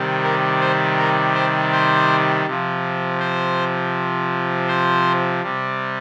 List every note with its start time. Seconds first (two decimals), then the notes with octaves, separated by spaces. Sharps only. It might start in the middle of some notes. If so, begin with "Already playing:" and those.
Already playing: C3 D#3 G3
0.24 A#4
0.61 C5
0.99 A#4
1.35 C5
1.72 C5
2.46 C3 F3
3.20 C5
4.68 C5
5.43 C3 G3